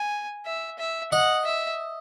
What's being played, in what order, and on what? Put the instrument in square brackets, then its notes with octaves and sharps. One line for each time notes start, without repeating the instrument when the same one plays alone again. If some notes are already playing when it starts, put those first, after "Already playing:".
Already playing: [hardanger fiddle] G#5
E5
E5
[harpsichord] D#5 [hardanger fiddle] F#5
[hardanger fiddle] E5